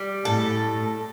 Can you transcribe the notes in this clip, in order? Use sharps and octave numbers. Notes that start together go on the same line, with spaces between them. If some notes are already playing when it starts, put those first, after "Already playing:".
Already playing: G3
A2 A4